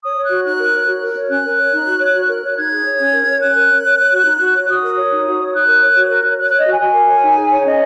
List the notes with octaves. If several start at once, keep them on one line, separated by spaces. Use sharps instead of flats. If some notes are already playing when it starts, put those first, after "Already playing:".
C#5 D#6
C#5
F#6
F#4
D#4 F#6
A#4
C#5
F#4
A#4
C#5
C#4 F#6
A#4
C#5
D#4
F#4
C#5
F#4
A#4
C#5
D#4 G#6
G#4
C#5
C#4
A#4
C#5
C#4 F#6
A#4
C#5
C#5
C#5
F#4
D#4
F#4
C#5
F#4 D#6
A#4
C#5
D#4
F#4
C#5
D#4 F#6
A#4
C#5
F#4
A#4
C#5
C#5 F#6
C#5 F#6
D#5
F#4 G#5
F#4 G#5
A#4
C#5
D#4
G#4
C#5
C#4 D#5